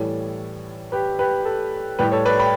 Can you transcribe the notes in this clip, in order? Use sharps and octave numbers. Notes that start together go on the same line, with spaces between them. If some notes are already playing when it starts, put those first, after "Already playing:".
Already playing: A2 E3 G3 A4 C#5
G4 B4
G4 B4
A4
A2 G3 G4 B4
A4 C#5
B4 D5
G5 B5